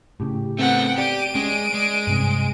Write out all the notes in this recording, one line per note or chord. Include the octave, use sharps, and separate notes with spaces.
A2 C#3 G4
A3 B3 C4 F#5 G5
G4 D5 D7 D#7
G#3 C#4
G#3
G2 C3 C4